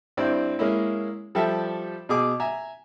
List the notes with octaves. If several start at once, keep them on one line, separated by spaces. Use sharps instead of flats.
G2 C4 E4 D5
G#3 A#3 C#4 E4
F3 G3 G4 A4 E5
B2 G#4 D6
E5 G#5 A#5